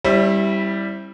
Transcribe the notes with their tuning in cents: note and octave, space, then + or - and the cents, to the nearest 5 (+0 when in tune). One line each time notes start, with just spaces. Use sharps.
G3 +0 C4 +45 E4 +0